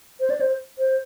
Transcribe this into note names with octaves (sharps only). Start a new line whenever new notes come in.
C5
D5
C5
C5